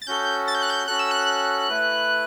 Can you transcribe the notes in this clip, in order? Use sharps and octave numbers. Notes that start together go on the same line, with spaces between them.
A6
C#4 F#4 A4 G6
A6
G6
F#6
G6
C#4 F#4 A4 F#6
E6
F#6
A3 E4 B4